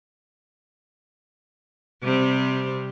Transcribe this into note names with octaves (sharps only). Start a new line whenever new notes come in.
C3 G3 C4